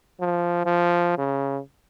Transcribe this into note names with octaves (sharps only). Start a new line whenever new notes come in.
F3
F3
C#3